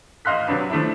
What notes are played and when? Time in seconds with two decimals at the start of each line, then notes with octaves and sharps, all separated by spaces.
0.25 A1 D#5 F5 C6 F#6 B6
0.47 C3 F#3 D4 B4
0.70 F3 A3 D4 E4